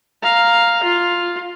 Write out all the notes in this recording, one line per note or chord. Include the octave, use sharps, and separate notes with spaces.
F5 A#5
F4